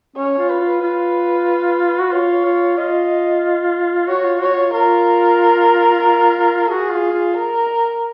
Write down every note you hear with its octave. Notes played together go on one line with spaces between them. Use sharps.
C#4 C#5
F4
B4
F4
F4 B4
F#4
F4 C#5
F4
F4 D#5
F#4 C#5
F4
F#4 C#5
F4
F4 A#4
F#4 G#4
F4
F4
A#4